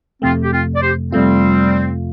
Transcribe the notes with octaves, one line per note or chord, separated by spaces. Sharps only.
F2 C3 A3 C4 F4
G4
C4 F4
D5
G4 C5
F2 C3 G3 A3 C4 F4